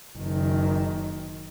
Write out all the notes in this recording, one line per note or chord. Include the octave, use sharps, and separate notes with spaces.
F#1 D#3